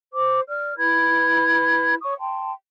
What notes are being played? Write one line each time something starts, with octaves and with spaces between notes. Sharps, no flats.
C5 D6
D5 F6
E4 B4 B5 G#6
C#5 C#6 D#6
G5 A5 C6